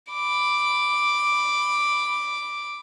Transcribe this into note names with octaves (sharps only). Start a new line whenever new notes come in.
B5 D6